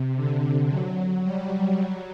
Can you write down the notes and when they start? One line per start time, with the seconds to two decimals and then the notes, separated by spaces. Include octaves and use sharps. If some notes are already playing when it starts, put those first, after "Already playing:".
Already playing: C3
0.15 D3
0.69 F#3
1.23 G3
1.77 F#3